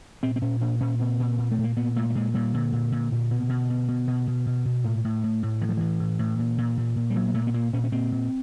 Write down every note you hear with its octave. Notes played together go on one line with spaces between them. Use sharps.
A#2 C4
C4
A#2 C#4
A#2 D4
A#2 C#4
A#2 C4
A#2
A#2
A3
A#2
A#3
A#2 B3
A#2 A3
A3
A#2 G#3
A#2 G3
A#2 D3
A#2
A#2
A#2
B2
B2
B2
B2
B2
B2
B2
B2
A2
A2
A2
A2
A2 E3
F3
A2 E3
A2
A2
A#2
A#2
A#2
A#2
G3
A#2 F#3
A#3
A#2 A3
B3
A#2 A#3
A#2 C#4
C#4
A#2 C4
A#2